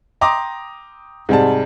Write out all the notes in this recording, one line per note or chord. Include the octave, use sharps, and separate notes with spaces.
G5 A#5 C6 D6 D#6 A#6
G#2 C3 G3 G#4 A5